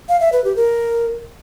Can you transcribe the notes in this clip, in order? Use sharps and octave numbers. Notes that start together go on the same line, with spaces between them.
F5
E5
B4
G4
A#4